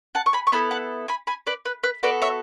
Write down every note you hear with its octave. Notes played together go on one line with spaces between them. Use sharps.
F#5 A5
C#6
G#5 B5
C#6
B3 E4 A4 G#5 B5
F#5 A5
G#5 B5
G#5 B5
B4 D5
B4
B4
B3 F#4 A4 B4 D5
C#5 E5